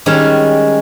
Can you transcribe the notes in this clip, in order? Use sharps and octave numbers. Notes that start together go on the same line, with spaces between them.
D#3 G3 G#3 C#4